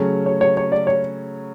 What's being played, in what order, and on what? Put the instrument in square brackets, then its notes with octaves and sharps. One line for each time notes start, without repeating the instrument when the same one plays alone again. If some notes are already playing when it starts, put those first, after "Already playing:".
Already playing: [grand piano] C#3 F#3 A3 C#4
[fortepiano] C#5
C#5
C#5
D5
C#5